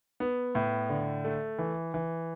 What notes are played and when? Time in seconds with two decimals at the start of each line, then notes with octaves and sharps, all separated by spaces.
0.20 B3
0.55 A2
0.90 D3
1.25 A3
1.59 E3
1.94 E3